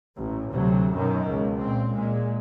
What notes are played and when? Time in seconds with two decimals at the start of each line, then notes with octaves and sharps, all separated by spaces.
0.16 A1
0.51 D2 C3 F#3
0.95 F#2 B2 D#3
1.29 C#2
1.58 A#2 C4
1.92 A#2 G#3